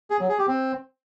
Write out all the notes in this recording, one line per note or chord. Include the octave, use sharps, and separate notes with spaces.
G#4
F#3
G#4
G4
C4